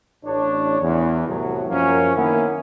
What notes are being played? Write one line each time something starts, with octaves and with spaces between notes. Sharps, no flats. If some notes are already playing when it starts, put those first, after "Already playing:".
A1 D4 C#5
E2
C2 A2 F#3
F#2 F3 F#3 A#3 C#4
D#3 A#3 B3 C#4 E4